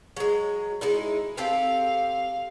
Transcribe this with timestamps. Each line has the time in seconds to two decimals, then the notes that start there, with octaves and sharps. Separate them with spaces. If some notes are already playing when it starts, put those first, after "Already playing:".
0.17 F#3 G#3
0.81 G#3 D#4 E4
1.37 C4 G4 A4 F5